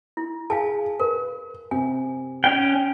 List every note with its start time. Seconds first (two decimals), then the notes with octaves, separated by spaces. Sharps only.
0.17 E4
0.50 G#4 F5 G#5 A5
1.00 A#4 B4
1.71 C3 G#5
2.44 C#4 G5